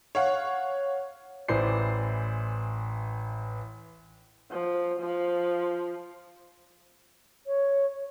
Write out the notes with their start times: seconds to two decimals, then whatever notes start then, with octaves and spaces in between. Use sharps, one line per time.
0.15 C#5 F5 F#5
1.48 A1 E3 C5 D5 C7
4.51 F3
5.00 F3
7.47 C#5